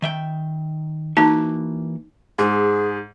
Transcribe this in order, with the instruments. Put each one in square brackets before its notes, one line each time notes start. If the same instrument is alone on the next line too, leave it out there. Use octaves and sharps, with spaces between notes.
[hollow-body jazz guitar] D#3 E5 G5
[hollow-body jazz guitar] E3 A#3 F#4 [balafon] D#4 A5
[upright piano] G#2 [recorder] G#4